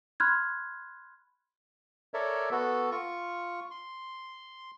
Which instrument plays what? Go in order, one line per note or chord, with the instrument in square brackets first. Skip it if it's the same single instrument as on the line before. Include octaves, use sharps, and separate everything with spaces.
[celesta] B5 C6 F6 F#6 G#6
[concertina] A4 A#4 C#5 D5 E5
B3 F#4 A4
F4 C#6
C6